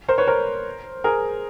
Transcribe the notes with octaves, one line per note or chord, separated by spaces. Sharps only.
A#4 C5
B4 C#5
A#4 C5
G#4 A#4